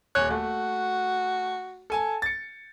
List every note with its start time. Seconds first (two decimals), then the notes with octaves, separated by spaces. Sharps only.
0.15 D#1 C#5 G#5 F#6
0.30 A3 F#4
1.90 A4 G#5 A5
2.22 A6 C#7